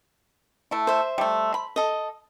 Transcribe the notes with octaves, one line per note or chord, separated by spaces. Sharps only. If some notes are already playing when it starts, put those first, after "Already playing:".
A3 E4
C5 E5
G3 A3
B5
A4 D#5